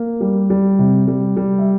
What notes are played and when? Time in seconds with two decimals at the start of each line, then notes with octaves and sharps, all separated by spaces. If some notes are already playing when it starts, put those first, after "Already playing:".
Already playing: A#3
0.21 G3
0.50 G3
0.79 C3
1.08 G3
1.37 G3
1.58 E5